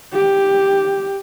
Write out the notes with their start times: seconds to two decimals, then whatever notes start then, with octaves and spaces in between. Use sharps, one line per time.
0.13 G4